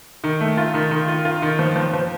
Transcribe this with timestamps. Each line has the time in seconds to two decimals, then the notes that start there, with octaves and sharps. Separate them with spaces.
0.24 D#3
0.40 A3
0.57 F4
0.74 D#3
0.91 D#3
1.08 F4
1.25 F4
1.42 D#3
1.59 F3
1.76 F3
1.93 F3